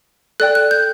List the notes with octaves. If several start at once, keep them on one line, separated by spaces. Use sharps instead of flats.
A4 D5 G5 F#6
F#6
G6